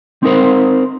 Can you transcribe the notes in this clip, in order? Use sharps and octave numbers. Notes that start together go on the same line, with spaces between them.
C4 D#4 A#4 C5